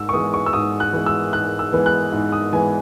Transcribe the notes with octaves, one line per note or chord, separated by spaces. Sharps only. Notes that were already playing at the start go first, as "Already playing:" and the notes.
Already playing: G#2 E6
C#6
E3 G#3 B3 D#6
C#6
E6
G#2 D#6
F#6
E3 G#3 B3
E6
G#2 F#6
E6
E3 G#3 B3
F#6
G#2
D#6
E3 G#3 B3 G#5